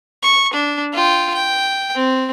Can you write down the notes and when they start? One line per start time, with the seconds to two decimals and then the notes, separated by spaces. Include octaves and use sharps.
0.23 C#6
0.54 D4
0.94 F4 G5
1.34 G5
1.95 C4